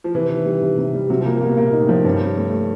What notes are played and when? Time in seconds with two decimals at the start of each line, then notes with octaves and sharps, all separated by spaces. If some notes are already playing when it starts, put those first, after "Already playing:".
0.04 F3
0.15 C3 E3
0.30 D#3
0.46 G3
0.62 C3
0.78 C3
0.94 G3
1.09 C3 F#3
1.21 F3
1.25 A#3
1.33 F3
1.41 B2 A#3
1.57 A#2 A#3
1.73 D#4
1.81 A2
1.89 F3
2.04 G2 C#4
2.21 C#4
2.37 A3
2.52 A3